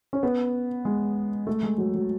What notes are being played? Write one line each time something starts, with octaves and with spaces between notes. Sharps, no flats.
C#4
B3
G#3
A3
G#3
F#3
F#3